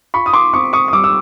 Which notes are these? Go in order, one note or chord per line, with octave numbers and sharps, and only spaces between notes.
F4 B5 C#6
D#6
C6 D6
C4 C#6 D#6
C#6 D#6
D#6
G3 D6 E6
E6